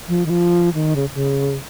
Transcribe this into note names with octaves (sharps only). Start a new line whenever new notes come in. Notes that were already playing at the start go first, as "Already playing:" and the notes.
F3
D#3
F3
D#3
C#3
C#3